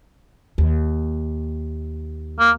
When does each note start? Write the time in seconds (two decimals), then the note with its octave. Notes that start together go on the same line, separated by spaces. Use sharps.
0.58 D#2
2.40 A#3